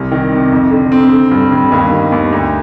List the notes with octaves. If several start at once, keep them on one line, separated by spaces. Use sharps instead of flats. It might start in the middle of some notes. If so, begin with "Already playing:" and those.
Already playing: C2
D#3
C3
F2
D3
C4
D3
G2
G2
D#2
D#3
D#2
D2